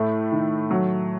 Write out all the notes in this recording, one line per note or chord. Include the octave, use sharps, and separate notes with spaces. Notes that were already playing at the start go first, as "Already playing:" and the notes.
Already playing: A2 A3
D#3
F#3